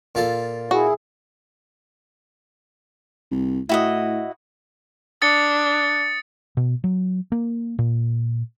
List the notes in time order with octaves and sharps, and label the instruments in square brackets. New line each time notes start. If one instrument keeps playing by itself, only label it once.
[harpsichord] A#2 F4 A4
[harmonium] E4 G#4 [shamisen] F#4
[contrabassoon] C2
[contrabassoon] A2 [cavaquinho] E4 F#4 D#5
[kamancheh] D4 [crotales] D#6 A6 C#7
[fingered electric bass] B2
F#3
A#3
A#2